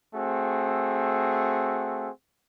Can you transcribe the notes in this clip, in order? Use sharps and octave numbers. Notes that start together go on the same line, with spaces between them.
A3 C4 F#4 G#4